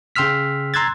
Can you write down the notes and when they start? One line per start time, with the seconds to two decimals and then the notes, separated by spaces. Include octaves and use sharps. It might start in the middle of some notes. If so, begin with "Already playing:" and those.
0.16 C#3 G5 C6 E6 F6 B6
0.74 A#5 C6 E6 F#6 G#6 A6